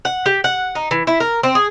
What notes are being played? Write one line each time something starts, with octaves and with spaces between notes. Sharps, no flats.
F#5
G4
F#5
D#4
E3
E4
A#4
C4
G#4